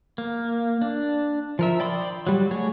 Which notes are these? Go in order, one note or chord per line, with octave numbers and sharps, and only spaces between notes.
A#3
D4
F3 A#4 E5
D5 G5 B5 C6 D#6
F#3 G3
A3 F#4 G#4 C#5